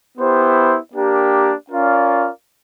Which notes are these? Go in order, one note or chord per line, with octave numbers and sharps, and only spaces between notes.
B3 E4 G4 C5
A#3 D4 G4 A#4
C#4 F4 A#4 D5 F5